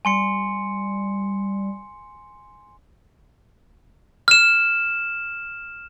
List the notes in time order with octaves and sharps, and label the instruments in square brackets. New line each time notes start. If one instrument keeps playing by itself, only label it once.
[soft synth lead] G3 [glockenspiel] G#5 C6 C#7
[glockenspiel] F6 E7